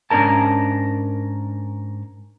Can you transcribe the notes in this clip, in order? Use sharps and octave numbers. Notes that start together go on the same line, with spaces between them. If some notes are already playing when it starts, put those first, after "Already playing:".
G#2 C#4 D4 A#4 A5